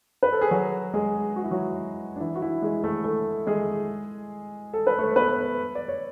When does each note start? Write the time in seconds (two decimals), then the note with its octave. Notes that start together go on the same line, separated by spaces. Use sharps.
0.23 B4
0.32 A4
0.41 G#4
0.51 F#3 F#4
0.94 G#3 G#4
1.36 F#4
1.44 E4
1.51 F#3 F#4
2.16 D4
2.20 E3 E4
2.35 F#4
2.42 E3 E4
2.62 G#3 G#4
2.84 A3 A4
3.04 A3 A4
3.47 G#3 G#4
4.73 A4
4.87 B4
4.99 A3 A4
5.16 B3 B4
5.75 D5
5.88 C#5